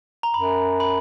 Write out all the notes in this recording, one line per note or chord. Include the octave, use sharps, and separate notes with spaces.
A#5
F#2 B5
B5